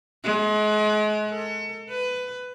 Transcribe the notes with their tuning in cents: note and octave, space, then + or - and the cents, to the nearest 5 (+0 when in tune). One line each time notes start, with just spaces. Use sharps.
G#3 +35
A4 +40
B4 +15